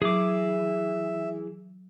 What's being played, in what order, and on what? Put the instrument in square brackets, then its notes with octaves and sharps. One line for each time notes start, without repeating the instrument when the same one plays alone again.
[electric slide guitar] E3 [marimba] F#3 [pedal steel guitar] G#4 D6 [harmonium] E5